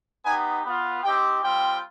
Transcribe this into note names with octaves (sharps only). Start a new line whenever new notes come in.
B3 D#4 G4 G#5
B3 F4
C4 D#4 G4 G5
G3 C4 F4 G5